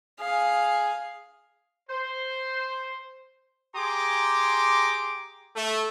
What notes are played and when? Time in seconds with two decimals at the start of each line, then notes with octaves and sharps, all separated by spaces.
0.20 G#4 F5
1.90 C5
3.76 G4 G#4 A#5 C6 D6
5.56 A3